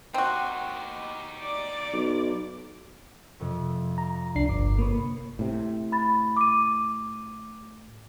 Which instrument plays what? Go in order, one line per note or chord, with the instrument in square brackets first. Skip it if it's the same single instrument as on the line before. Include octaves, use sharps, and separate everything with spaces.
[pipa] C4 F#4 [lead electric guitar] D#4 G4
[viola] D5 D6
[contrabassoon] B1
[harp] F2 C3 C#4
[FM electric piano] A#5
C2 D4 C7
[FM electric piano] G1 [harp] D6
[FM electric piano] A#3 [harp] B3 B4 C#5
[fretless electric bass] A2 C3
[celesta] B5 A6
D6 D#7